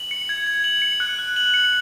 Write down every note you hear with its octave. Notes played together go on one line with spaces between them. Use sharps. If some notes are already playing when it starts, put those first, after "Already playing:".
Already playing: F#7
C#7
G#6
G#6
F#7
C#7
F#6
F#6
F#7
C#7